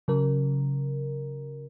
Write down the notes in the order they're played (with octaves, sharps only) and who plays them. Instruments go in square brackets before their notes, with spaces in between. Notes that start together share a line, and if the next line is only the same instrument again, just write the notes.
[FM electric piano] C#3 F#3 A#4